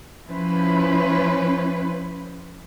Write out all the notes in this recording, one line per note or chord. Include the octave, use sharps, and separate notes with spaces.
F3 C#4 E4 B4 C5